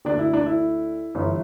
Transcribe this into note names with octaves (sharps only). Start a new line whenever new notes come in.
D2 D3 D4
E4
D4
E4
G1 G2 E3